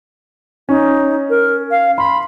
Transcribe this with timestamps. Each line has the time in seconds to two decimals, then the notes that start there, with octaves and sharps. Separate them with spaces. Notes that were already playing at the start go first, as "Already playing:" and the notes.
0.69 C#4 D#4
1.30 A#4
1.71 F5
1.98 B5 C6